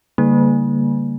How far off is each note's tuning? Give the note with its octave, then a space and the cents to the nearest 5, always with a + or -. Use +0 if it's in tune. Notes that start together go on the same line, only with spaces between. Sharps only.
D3 -30 G3 +20 A#3 -5